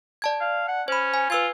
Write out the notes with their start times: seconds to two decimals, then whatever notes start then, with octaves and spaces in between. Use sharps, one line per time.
0.22 D5 A5 G#6
0.41 F5
0.68 F#5
0.88 C#4 C5 B5
1.14 G#5
1.30 F4 B4 E6 G#6